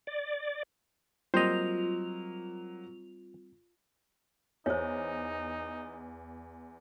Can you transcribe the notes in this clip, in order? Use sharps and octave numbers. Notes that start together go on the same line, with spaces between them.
D5
F#3 G3 A#3 C4 F4 C5 D#5 F7
E2 D#4 C5 C#5